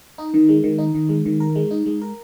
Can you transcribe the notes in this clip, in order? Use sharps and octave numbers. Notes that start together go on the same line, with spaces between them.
D#4
D#3
G#3
D#3
D#4
D#3
G#3
D#3
A#4
G#3
D#4
G#3
A#4